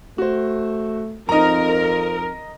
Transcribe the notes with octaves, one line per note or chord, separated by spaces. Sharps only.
A3 F#4 C5
F2 C4 D#4 A#4 D#5 A#5